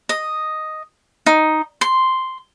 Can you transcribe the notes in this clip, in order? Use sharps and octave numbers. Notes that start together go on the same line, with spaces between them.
D#5
D#4
C6